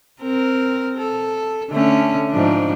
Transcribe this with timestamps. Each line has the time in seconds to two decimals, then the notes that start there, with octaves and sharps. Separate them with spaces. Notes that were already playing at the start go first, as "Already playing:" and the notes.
0.22 C4 A#4
0.98 A4
1.71 D3 A3 C#4
2.31 G#2 F3 D4